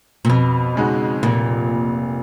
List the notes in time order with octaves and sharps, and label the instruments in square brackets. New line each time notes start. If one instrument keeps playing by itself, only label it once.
[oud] A#2
[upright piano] F2 [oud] B2
[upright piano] C#3 G#3 D#4 F#4
[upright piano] F1 [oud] A#2